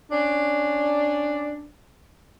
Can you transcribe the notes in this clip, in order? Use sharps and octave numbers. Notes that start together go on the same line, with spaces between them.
C#4 D4